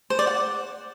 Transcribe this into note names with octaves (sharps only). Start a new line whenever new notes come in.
C5
D5
F#5